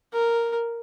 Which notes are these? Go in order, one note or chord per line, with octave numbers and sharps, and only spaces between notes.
A#4